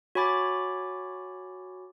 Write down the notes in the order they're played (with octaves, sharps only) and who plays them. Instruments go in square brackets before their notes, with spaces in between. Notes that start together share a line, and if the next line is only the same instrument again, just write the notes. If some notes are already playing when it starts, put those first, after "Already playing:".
[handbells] F#4 C#5 G#5 B5 D6 A6